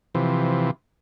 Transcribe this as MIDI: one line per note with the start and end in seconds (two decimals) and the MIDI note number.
0.15 0.71 48
0.15 0.71 52
0.15 0.71 53